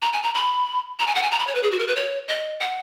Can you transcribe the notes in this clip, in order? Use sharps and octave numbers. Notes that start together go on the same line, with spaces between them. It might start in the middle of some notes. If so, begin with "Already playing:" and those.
A#5
G#5
A#5
B5
A#5
G#5
F#5
G#5
A#5
B5
C#5
B4
G#4
F#4
A#4
B4
C#5
D#5
F#5